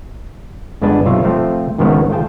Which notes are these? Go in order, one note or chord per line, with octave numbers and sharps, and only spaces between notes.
G1 G#3 B3 D4 B4 A5
B1 C3 F4 C#5 E5
F3 A3 C4 F4
G#1 C#2 D#3 F3 B3 C#5
A3 F4 G#4 G5 A5